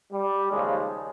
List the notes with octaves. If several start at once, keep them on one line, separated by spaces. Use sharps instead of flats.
G3
D#2 C#3 F3 G#3